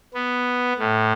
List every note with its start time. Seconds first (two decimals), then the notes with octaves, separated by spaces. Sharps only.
0.14 B3
0.79 A2